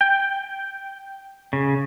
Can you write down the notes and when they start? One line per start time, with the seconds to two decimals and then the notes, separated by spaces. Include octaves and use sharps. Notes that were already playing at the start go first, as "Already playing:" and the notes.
0.01 G5
1.53 C#3